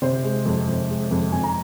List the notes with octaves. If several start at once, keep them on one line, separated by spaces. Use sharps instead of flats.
C3 C5
G#3
F2
F2
G#3
F2
F2 G#5
A#5